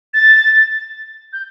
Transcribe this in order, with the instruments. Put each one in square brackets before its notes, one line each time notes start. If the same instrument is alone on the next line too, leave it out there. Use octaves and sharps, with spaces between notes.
[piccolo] A6
G6